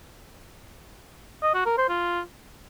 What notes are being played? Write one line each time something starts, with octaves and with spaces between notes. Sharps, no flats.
D#5
F#4
A#4
C5
F4